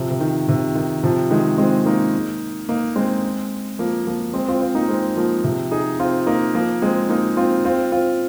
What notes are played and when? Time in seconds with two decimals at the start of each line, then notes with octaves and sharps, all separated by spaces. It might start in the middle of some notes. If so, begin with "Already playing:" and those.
Already playing: C3 F3
0.11 C3
0.20 D#3
0.48 C3
0.75 D#3
1.03 C3 F3
1.31 D#3 G#3
1.58 G#3 C4
1.86 A#3 D#4
2.69 A#3 D#4
2.96 G#3 C4
3.79 F3 A#3
4.07 F3 A#3
4.34 G#3 C4
4.48 C4 F4
4.61 C4 F4
4.75 A#3 D#4
4.89 G#3 C4
5.16 F3 A#3
5.44 C3 F3
5.71 D#4 G#4
5.99 C4 F4
6.26 A#3 D#4
6.55 F3 A#3
6.82 G#3 C4
7.09 A#3 D#4
7.37 C4 F4
7.65 C4 F4
7.92 C4 F4